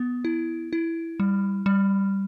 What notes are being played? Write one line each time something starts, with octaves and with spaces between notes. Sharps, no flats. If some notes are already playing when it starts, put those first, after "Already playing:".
Already playing: B3
E4
E4
G3
G3